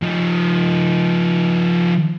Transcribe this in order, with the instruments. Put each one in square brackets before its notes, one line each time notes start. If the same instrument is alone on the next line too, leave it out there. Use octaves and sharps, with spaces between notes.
[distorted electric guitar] F3 D#4